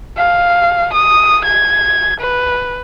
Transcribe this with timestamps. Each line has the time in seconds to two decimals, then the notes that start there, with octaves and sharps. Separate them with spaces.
0.17 F5
0.94 D#6
1.45 G#6
2.20 B4